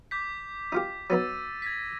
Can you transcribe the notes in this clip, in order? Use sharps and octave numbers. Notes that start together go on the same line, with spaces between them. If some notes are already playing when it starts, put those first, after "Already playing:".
D6 G6 B6
D#4 F4 G4
F#3 B3 D#4 E6 A6 D#7
G#6 A#6 B6